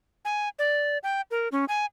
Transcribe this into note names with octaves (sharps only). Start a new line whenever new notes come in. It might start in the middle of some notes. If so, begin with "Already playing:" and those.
G#5
D5
G5
A#4
C#4
G#5